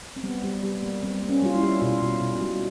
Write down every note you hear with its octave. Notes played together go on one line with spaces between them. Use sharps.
C4
G3 B3
G3
G3
A#3
G3 C4
A#3
C#4
G3 F4
E4
G3
B2 F4
B2
B2
G3